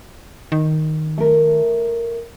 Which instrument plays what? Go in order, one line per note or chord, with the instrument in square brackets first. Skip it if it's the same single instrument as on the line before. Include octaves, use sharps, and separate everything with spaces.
[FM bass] D#3
[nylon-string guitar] A3 A#4